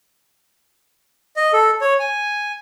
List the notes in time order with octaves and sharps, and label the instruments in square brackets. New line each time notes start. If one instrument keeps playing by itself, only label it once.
[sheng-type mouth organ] D#5
A4
C#5
G#5